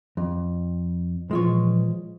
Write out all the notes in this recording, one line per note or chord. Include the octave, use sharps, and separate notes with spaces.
F2
A#2 E3 F3 G#3 F4 C#5